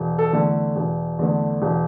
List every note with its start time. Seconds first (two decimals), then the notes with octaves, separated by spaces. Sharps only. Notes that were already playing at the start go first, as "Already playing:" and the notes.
Already playing: E1
0.18 A4
0.33 E2 D3 A3
0.76 E1
1.19 E2 D3 A3
1.62 E1